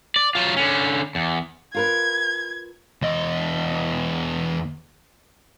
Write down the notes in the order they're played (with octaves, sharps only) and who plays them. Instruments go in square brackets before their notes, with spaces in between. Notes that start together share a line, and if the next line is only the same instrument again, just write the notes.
[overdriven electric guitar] D5
F#3 F4
D3 C#4
E2
[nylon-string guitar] F4 A#4 B4 [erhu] G#6
[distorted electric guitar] E2 D#5